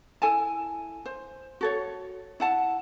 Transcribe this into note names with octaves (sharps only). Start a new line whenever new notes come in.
E4 A4 G#5 A5
C5
F#4 A4 C#5
E4 F#5 A5